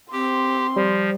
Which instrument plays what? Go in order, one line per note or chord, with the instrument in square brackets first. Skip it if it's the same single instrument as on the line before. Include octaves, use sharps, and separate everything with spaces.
[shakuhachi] C4 [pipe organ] G4 [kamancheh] C6
[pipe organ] F3 [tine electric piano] G3